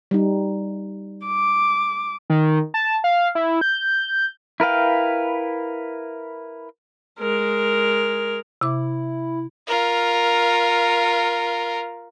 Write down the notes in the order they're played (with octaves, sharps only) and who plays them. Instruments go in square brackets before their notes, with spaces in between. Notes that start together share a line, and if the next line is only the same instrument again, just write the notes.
[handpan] G3 D#4
[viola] D6
[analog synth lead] D#3
A5
F5
E4
G6
[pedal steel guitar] E4 A#4 B4 F5 G5
[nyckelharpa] G#3 A#4
[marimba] C3 D6 [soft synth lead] E4
[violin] F4 A#4